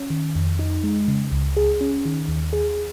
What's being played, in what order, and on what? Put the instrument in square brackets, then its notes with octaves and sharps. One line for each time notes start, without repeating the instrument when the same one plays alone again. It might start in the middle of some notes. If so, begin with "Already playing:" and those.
Already playing: [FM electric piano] C#4
D#3
F2
D#4
G#3
C#3
C#2
G#4
C#4
D#3
D#2
G#4